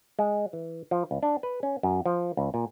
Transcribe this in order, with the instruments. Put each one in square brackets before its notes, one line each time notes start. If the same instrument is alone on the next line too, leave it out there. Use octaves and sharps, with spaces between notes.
[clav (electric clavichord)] G#3
E3
F3
C#2
D4
B4
C#4
F#2
F3
C#2
A#2